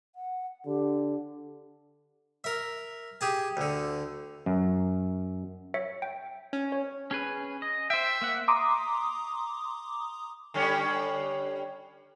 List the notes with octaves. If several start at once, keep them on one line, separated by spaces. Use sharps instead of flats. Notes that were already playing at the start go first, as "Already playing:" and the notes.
F#5
D3 G4
A#4 E5
G4 G#4 A5
D2 D3
F#2
C#5 E5 C#7
G5
C#4
C#5
C#4 G#4 B4
D#5
C5 E5 G5
A#3 F#5
A#5 C6 D6 D#6
D3 G3 C#4